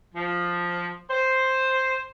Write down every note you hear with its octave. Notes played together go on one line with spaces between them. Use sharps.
F3
C5